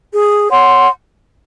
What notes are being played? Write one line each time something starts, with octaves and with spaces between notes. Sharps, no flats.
G#4
C#5 F#5 C6